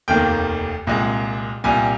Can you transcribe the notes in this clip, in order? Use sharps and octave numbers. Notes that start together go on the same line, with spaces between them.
F1 D#2 D#3 A#3 G5
C2 A#2 G#3
C2 A#2 G3 G#5